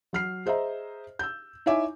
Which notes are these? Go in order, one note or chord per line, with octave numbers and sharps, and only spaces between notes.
F#3 F6 C7
G#4 C5 D#5 E5 A#5
E6 G6
D#4 E4 C#5 E5 G#5 D6